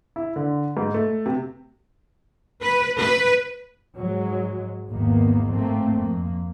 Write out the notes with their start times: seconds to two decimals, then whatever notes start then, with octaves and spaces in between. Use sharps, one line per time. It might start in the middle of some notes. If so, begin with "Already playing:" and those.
0.16 E4
0.36 D3
0.77 G#2
0.94 A3
1.26 C3
2.62 B4
2.97 B4
3.95 G#2 F#3 G#3
4.91 G#1 E2 D#3 A#3 B3
5.50 A2 A3 A#3 C4
5.94 F2 A#3